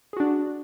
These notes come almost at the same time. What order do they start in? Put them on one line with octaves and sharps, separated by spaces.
G#4 F#4 D4